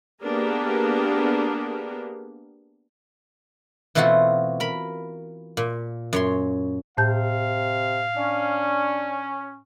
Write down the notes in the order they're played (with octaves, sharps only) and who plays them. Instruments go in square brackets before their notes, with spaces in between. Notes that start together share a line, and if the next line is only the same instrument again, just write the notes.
[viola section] A#3 B3 D4 G4 G#4 A#4
[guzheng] B2 E3 A3 C4 F4 F#4
A#4 B5
A#2
F#2 C#5 C6
[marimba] A2 A5 G6 [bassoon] C3 [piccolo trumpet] F5
[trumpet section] C#4 [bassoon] D4